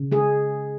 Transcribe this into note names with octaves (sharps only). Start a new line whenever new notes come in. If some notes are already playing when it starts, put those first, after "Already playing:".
Already playing: C#3
G#3 G#4